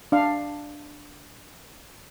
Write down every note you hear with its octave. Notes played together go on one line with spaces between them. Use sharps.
D4 F5